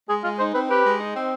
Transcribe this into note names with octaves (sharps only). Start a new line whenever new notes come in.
G#3 G#4
G#3 F4
D#4 C5
C4 B4
G4 B4
G#3
D#4
C4